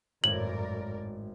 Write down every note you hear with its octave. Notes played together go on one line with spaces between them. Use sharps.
G#1 F#2 A2 A#4 D5 G#6 F#7